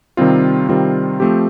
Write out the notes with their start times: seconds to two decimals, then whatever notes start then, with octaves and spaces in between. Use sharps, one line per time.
0.17 C3 D#3 G3 C4 F4
0.68 C3 D#3 G3 C4 F4
1.20 F3 A3 C4 G4